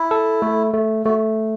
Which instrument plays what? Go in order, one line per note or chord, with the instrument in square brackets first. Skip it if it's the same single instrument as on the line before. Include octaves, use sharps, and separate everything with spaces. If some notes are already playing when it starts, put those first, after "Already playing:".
Already playing: [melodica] E4
[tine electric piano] A4
A3
A3
[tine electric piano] A3 [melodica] F#4